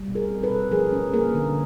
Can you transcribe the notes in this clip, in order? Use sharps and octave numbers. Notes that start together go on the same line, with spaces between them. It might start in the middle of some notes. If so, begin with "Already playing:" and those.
Already playing: G3
B2
G#4 A#4
C4
A4 B4
B2
F3 G#4 A#4
C#4
A#3 G#4 A#4
D3